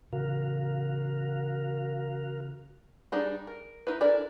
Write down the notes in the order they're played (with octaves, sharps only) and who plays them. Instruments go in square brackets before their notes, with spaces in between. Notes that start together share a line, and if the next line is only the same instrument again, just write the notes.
[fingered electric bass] C#3 E3 [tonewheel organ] F#4 A#4 F5
[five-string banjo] G3 D4 D#4 G#4
A#4
D#4 E4 B4
D4 E4 A4 A#4 D5